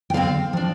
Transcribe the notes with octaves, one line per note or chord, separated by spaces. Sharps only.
G5
D3 A3 C4 F5
F3 D4